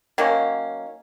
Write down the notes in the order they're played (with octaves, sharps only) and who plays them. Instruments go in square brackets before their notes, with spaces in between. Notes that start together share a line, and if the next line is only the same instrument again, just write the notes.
[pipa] D#3 F#3 A#3 C#4